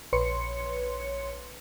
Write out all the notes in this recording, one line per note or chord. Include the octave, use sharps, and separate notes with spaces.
A#1 B4 C#5 C6 C#7